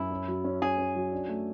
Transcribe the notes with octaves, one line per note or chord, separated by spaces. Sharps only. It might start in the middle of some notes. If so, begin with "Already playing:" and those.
Already playing: F#2 E4
C#4
F#3
C#4
C#4 G#4
C#4
F#3
D4
A3